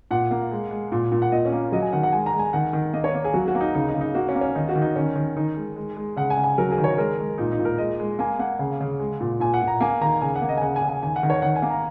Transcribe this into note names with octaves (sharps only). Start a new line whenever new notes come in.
A#2 F#5
A#3
G#3
G#3
A#2
A#2
F#5
A#2 D#5
C#4
A#3
F#3 D#5
G#5
D#3 F#5
F#5
G#3 G#5
A#5
G#3
G#5
D#3 F#5
D#3
A#3 D#5
C#5
A#3
G#4
F#3 F#4
F#4
A#3
D#4
C#3 D#4
D#4
C#3
D#4
A#3 F#4
C#4
A#3
C#4
D#3 D#4
F#4
D#3
D#4
D#3 C#4
D#3
D#3 D#4
G#3
G#3
G#3
C#3 F#5
G#5
C#3
G#5
F#3 A#4
G#4
D#3
C#5
G#3 A#4
G#3
A#2 D#4
D#4
A#2
A#4
G#3 D#5
G#3
A#3 G#5
A#3 F#5
C#3
C#3
G#3
A#2
A#2 G#5
F#5
A#2
A#5
A#3 G#5
D#3 A#5
C#3 G#5
F#5
A#3
D#5
G#5
C#3 F#5
G#5
C#3
G#5
D#3 G#5
F#5
D#3
C#5
D#3 F#5
G#5
A#3
A#5